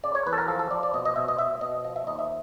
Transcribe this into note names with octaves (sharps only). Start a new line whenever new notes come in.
C#3 D5
C#5
E2 B4
A4
A#4
F3 A4
A4
F3 D5
D5
B2 D#5
D#5
B2 E5
D#5
B2 E5
B2 D#5
F3 D#5
E5
D#2 D#5
E5